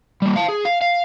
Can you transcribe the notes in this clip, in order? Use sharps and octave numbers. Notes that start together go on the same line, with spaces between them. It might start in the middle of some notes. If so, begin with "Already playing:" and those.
G3 A#3
F5 A5
G#4
F5
F5